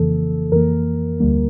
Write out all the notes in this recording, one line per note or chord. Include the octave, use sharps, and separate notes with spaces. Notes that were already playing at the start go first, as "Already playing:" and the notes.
Already playing: F2 C#3 E3 A#3 A4
F2 E3 A#3 A#4
D2 D3 G3 A#3